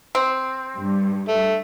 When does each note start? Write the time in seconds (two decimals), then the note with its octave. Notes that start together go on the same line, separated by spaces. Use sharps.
0.15 C4
0.77 G2
1.28 A3